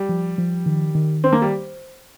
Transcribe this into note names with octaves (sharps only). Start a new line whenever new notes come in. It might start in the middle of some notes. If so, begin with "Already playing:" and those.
Already playing: G3
F3
F3
D#3
D#3
C4 C5
A#3
G3